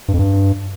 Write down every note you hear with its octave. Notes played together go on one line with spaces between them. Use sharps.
G2
F2
G2